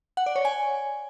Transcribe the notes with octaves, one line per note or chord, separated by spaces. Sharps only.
F#5
D5
C#5
G#5